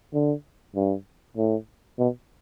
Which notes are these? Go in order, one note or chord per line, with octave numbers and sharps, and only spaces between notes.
D3
G2
A2
B2